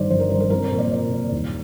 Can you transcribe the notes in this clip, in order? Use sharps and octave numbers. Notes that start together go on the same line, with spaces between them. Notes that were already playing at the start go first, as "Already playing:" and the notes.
Already playing: G1 G2 D#3 C5 D5
G1 C5
A#4
G2 D#3 C5
A#4
C2 A#4
C5
A#2
D5
C2 D5
A#2
D#2